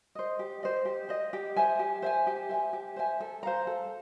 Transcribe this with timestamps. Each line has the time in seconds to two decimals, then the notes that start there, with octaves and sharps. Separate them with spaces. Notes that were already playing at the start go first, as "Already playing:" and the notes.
0.15 C5 D#5
0.39 G4
0.63 C5 D#5
0.85 G4
1.09 C5 D#5
1.33 G4
1.56 C5 E5 G#5
1.79 G4
2.02 C5 E5 G#5
2.27 G4
2.49 C5 E5 G#5
2.73 G4
2.96 C5 E5 G#5
3.20 A4
3.43 C5 F5 A#5
3.67 A4